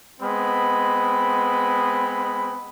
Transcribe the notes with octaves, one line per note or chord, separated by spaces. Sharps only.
G#3 B3 C4 B5